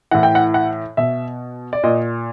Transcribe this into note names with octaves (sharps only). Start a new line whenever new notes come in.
A2 E3 F#5
G5
F#5
F#5
B2 E5
D5
A#2 D#5